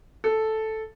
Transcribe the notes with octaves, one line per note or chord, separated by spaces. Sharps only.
A4